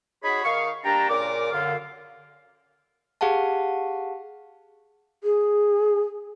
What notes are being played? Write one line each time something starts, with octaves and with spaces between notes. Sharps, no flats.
D#4 F#4 G#4 C#5 B5
D#3 F5 C#6
G3 A#3 D4 G5 A5 A#5
A#2 C#3 A#4 D5 D6
F#2 D3 F4 F5
G4 G#4 F5 F#5 A5
G#4